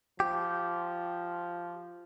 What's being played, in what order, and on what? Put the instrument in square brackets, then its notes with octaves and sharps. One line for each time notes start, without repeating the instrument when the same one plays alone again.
[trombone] F3 [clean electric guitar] G4